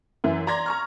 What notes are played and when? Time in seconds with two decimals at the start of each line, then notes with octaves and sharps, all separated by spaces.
0.24 F#2 E3 E4
0.47 D5 A#5 C6 G#6 A#6
0.66 A#5 C#6 F6